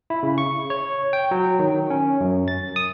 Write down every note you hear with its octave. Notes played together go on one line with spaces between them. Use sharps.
E4
C#3
C#6
C#5
G5
F#3
D#3
C#4
F#2
A6
D#6